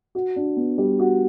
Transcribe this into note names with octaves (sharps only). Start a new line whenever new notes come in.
F#4
D4
B3
G3
F#4